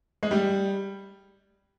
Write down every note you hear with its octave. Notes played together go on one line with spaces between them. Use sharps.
G#3
G3